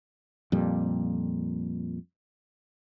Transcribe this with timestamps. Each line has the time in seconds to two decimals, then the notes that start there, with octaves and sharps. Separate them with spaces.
0.52 F2 A#2 G3